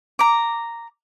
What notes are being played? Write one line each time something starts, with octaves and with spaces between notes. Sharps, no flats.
A#5 D6